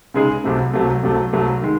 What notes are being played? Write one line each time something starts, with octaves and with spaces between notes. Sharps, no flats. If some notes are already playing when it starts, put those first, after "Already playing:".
C#3 G#3 D#4 G#4
C2 C3 F#3 A3
C2 C3 F#3 A3
C2 C3 F#3 A3
C2 C3 F#3 A3
D#3 G#3